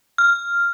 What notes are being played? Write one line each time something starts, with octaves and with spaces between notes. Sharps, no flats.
F6